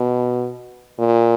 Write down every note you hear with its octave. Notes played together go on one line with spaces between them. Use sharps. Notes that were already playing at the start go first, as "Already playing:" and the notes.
Already playing: B2
A#2